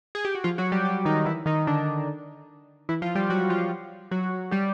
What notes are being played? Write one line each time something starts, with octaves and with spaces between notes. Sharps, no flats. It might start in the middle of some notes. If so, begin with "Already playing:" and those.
G#4
G4
F#4
F3 F4
F#3 F#4
G3 G4
G3 G4
D#3 D#4
E3 E4
D#3 D#4
D3 D4
E3 E4
F3 F4
G3 G4
F#3 F#4
F3 F4
F#3 F#4
G3 G4